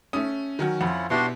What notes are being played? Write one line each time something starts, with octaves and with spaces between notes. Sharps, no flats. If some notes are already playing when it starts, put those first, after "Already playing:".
A3 C#4 D#6
D#3 F#3 C#4 F#4
F2 C#4 E4 F4 F#5
B2 B3 D4 E4 F#4 G4 C6